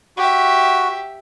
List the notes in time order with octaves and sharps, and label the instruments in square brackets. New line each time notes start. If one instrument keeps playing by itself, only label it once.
[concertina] F#4 [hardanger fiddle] G4 E5